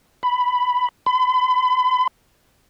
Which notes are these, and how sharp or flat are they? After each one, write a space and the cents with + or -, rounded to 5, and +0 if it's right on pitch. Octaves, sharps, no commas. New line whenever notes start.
B5 +5
B5 +40